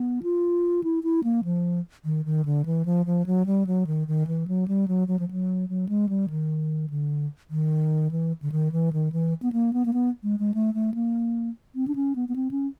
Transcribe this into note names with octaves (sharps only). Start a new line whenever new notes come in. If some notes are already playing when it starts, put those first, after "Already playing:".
Already playing: B3
F4
E4
E4
A#3
F3
D#3
D#3
D3
E3
F3
F3
F#3
G3
F#3
D#3
D#3
E3
F#3
G3
F#3
F#3
F3
F#3
F#3
G#3
G3
D#3
D3
D#3
E3
D3
D#3
E3
D#3
E3
B3
A#3
B3
A#3
B3
G#3
G#3
A3
A3
A#3
C4
D4
C#4
B3
B3
C4
C#4